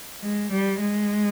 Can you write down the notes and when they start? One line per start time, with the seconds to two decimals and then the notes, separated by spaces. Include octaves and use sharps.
0.22 G#3
0.52 G3
0.81 G#3